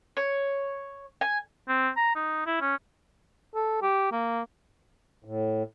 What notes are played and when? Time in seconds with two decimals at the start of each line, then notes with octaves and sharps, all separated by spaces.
0.17 C#5
1.21 G#5
1.68 C4
1.97 A#5
2.16 D#4
2.46 E4
2.61 C#4
3.55 A4
3.82 G4
4.12 A#3
5.25 A2